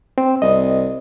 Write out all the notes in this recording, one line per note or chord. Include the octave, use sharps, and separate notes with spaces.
C4
C2 D#5